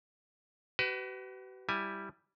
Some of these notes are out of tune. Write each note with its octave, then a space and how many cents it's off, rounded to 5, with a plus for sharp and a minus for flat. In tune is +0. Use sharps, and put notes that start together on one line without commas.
F#4 +45 B4 +20
G3 +0 E4 +0 G#5 +0